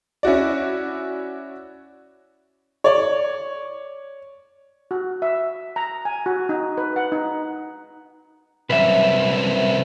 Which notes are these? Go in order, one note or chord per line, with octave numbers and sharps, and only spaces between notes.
C#4 E4 F#4 D5
C#5 D5
F#4
E5
A#5
G#5
F#4
D#4
B4
F#5
D#4
C2 F#2 B4 E5